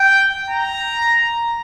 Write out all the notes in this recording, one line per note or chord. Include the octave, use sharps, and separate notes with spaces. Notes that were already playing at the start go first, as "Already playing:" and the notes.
Already playing: G5
A#5